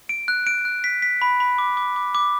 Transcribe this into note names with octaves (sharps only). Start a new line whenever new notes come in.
D7
F#6
D7
F#6
B6
B6
B5
B5
D6
D6
D6
D6